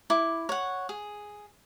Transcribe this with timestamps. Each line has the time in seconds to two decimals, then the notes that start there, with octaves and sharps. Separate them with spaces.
0.10 E4 D6
0.49 C#5 F#5
0.89 G#4